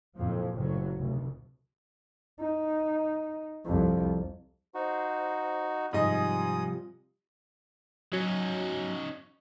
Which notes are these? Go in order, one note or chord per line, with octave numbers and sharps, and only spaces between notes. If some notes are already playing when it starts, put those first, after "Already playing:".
F#1 F2 A#2 F3
F#1 A2 F#3
F1 D2 B2
D#4
C2 F2
D#4 F#4 C5
G#2 C3 F3 G3 D#5 G#5 D#6
F#3 C#4 D#4